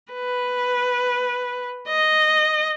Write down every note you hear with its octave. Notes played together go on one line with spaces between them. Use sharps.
B4
D#5